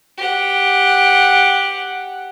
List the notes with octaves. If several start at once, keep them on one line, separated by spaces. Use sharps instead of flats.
G4 F#5